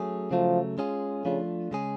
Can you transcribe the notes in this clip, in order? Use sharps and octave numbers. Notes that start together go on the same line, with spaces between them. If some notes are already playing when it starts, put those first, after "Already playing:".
Already playing: F#3 A3 C#4 G#4
C#3 F3 F#3 A3
G#3 C#4 F4 G#4
C#3 F3 A3 D4 F4
C#3 G#3 C#4 G#4